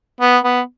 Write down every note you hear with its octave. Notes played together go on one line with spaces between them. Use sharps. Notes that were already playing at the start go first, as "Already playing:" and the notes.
B3
B3